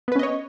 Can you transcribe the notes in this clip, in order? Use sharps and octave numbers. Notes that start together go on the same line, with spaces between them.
B3 C#4 B4 C#5 D#5